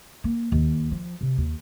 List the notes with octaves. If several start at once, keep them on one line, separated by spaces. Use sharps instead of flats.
A#3
D#2
F3
C3
D#2